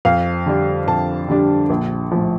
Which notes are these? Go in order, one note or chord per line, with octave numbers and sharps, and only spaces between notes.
F2 F5
D3 G3 D4
F2 A5
D3 G3 D4
A#1
A2 F3